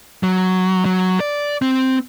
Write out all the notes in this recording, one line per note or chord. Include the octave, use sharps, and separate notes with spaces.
F#3
F#3
D5
C4